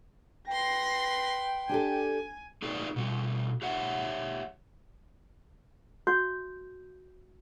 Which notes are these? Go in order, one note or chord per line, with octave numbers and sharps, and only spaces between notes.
B4 G5 C6 A#6 C7
D4 G4 A4 G#5
D#4 F#4 G#4 A#4 B4 D5
B2 G3
G4 C#5 E5 F#5
F#4 G6